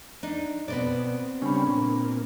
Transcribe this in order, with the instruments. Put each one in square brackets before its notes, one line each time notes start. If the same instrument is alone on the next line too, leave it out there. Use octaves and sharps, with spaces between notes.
[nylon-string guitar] D4 D#4
[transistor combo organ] B2 [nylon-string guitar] B3 C4 D5
[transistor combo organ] C#3 G3 C#4 [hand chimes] D4 B5
[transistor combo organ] A#2